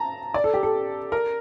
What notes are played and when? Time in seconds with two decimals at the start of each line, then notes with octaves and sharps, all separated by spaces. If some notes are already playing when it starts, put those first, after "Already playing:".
Already playing: A5 A#5
0.34 D5
0.44 A4
0.54 G4
0.63 A4
1.12 A#4